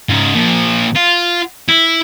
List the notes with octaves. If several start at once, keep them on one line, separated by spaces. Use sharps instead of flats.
G#2 C#3
A#2 F3
F4
E4